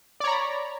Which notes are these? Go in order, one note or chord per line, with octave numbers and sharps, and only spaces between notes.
C#5 D5 A#5 B5